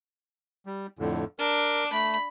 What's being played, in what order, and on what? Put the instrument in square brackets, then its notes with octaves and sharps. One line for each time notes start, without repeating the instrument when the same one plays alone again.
[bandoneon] G3
F2 A2 D3
[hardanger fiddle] D4 [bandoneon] A#4
[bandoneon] A3 [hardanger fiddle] B5